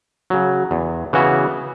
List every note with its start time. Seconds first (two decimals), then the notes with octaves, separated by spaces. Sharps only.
0.30 C#3 F#3
0.71 E2
1.13 C#3 E3 B3 F#4